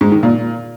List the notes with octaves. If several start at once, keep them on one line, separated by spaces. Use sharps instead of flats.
G#2
D#3
A#2